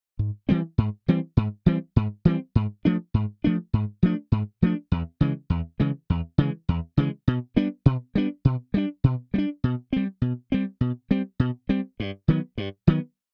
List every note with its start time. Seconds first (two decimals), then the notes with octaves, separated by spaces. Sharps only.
0.19 G#2
0.49 E3 G3 C4
0.78 G#2
1.08 E3 G3 C4
1.37 G#2
1.66 E3 G3 C4
1.96 G#2
2.25 E3 G3 C4
2.55 G#2
2.85 F3 A3 D4
3.14 G#2
3.44 F3 A3 D4
3.73 G#2
4.03 F3 A3 D4
4.32 G#2
4.62 F3 A3 D4
4.92 E2
5.21 C#3 E3 G#3
5.50 E2
5.80 C#3 E3 G#3
6.10 E2
6.38 C#3 E3 G#3
6.69 E2
6.97 C#3 E3 G#3
7.28 B2
7.56 G3 B3 D4
7.86 B2
8.15 G3 B3 D4
8.45 B2
8.74 G3 B3 D4
9.04 B2
9.34 G3 B3
9.38 D4
9.64 B2
9.93 G3 C4
10.22 B2
10.52 G3 C4
10.81 B2
11.11 G3 C4
11.40 B2
11.69 G3 C4
12.00 G2
12.28 D#3 F#3 B3
12.58 G2
12.87 D#3 F#3 B3